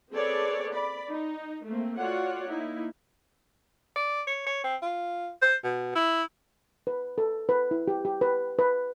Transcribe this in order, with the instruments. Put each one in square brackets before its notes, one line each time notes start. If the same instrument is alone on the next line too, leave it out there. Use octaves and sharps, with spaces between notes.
[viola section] C4 G#4 A4 B4 C#5 D5
D5 B5
D#4
A3 A#3 C4
F4 F#4 C#5 D5 F#5
A#3 D#4 E4
[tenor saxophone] D5
C#5
C#5
C4
F4
C5
B2
E4
[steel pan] B4
A4
B4
E4
G4
G4
B4
B4